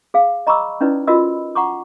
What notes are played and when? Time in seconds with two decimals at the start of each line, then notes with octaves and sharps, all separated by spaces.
0.14 G#4 F5
0.47 D#5 A#5 B5 C#6 D6 E6
0.81 C#4 D#4 E4 B4 D5
1.07 F4 F#4 A#4 D#5 B5 E6
1.55 F#5 A#5 C#6 D6